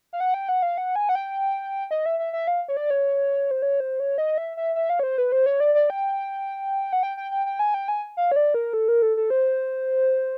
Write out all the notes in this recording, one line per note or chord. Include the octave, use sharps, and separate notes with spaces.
F5
F#5
G5
F#5
F5
F#5
G#5
F#5
G5
D#5
E5
E5
E5
F5
C#5
D5
C#5
C5
C#5
C5
C#5
D#5
E5
E5
E5
F5
C#5
C5
B4
C5
C#5
D5
D5
G5
F#5
G5
G5
G5
G5
G#5
G5
G#5
F5
C#5
D5
A#4
A4
A#4
A4
A4
C5